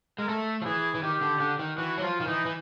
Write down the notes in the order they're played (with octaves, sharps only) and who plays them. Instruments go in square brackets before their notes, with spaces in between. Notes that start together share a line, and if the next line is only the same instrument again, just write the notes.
[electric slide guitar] G#3 [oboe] A#4
[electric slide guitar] A3 [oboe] A4
[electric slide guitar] F3
[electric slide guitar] E3 [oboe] G#4
[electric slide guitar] E3
[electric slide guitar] D#3 [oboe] G4
[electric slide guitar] D3
D3
D#3
[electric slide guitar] E3 [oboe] F#4
[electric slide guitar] F#3
[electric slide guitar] F3 [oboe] F4
[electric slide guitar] D#3
[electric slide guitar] E3 [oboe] D#4
[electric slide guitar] E3